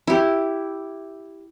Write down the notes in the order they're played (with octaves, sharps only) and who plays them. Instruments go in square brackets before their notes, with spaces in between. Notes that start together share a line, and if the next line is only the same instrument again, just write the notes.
[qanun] E4 G4